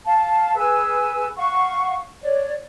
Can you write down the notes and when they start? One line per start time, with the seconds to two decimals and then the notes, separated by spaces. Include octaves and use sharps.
0.06 F5 A5
0.56 G#4 B4 G#5 E6
1.36 F5 F#5 C#6
2.21 C#5 D5